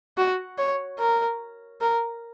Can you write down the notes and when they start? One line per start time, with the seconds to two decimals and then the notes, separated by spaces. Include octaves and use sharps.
0.18 F#4
0.58 C#5
0.99 A#4
1.81 A#4